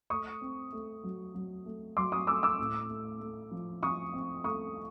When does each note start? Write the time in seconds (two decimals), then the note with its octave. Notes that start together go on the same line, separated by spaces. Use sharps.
0.10 A3 C#6 D#6
0.41 C4
0.73 A3
1.03 F#3
1.34 F#3
1.66 A3
1.97 F#3 C6 D6
2.12 C#6 D#6
2.27 A3 D6 E6
2.43 D6 E6
2.59 A2
2.89 A3
3.20 A3
3.51 F3
3.83 F3 C#6 D#6
4.14 C4
4.44 A3 C#6 D#6